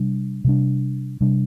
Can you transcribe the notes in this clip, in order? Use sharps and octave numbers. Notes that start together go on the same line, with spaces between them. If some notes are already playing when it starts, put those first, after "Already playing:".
Already playing: C3 G3 D4
C3 G3 D4
C3 G3 D4